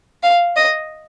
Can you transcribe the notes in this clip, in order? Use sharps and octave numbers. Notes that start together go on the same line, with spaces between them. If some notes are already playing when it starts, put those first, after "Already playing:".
F5
D#5